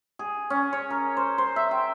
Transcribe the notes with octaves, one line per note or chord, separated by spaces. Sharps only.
G#4
C#4
C#5
A#4
C5
C5
E5
G5